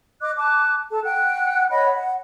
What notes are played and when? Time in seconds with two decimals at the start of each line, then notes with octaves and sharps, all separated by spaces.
0.21 D#5 D6 F#6
0.37 A5 D6 F#6
0.92 A4 A5
1.05 F#5 G5 F#6
1.70 C#5 D#5 F#5 B5
1.90 F#5